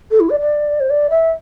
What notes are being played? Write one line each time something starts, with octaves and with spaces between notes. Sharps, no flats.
A4
E4
D5
D5
C5
D5
E5